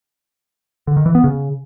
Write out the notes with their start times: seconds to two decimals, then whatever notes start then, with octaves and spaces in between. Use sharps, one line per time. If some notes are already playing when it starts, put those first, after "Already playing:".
0.87 D3
0.97 D#3
1.06 E3
1.15 B3
1.24 C#3